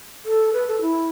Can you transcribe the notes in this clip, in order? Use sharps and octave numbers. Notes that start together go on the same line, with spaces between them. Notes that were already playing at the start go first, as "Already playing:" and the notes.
A4
B4
A4
E4